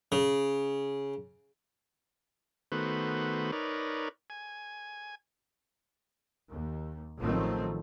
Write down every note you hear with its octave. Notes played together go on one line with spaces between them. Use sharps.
C#3
D#3 A3 B3 F#4 B4 C5
D#4 A#4 B4 C#5 D5
G#5
D#2
A1 D#3 F3 F#3 A3 C4